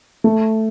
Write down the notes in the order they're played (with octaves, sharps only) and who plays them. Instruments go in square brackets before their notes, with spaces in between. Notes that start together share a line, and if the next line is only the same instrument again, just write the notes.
[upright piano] A3